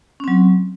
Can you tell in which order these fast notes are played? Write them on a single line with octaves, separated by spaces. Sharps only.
C#4 C4 F#3